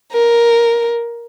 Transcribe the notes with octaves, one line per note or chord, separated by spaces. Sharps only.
A#4